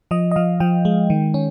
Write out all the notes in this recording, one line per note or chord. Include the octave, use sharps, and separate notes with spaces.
F3 D#5
D#5
F3 F5
F3 G5
G#3
D#3
C#4